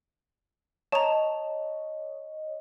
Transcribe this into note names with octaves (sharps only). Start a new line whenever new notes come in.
C#5 D#5 A5 A#5